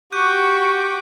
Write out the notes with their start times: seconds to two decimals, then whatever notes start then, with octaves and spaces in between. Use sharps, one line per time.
0.12 F#4 G4 G5 C#6 F#6 G6 D#7